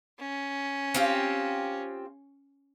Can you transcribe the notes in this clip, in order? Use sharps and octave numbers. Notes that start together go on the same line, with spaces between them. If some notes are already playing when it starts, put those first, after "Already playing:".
C#4
C4 F4 G4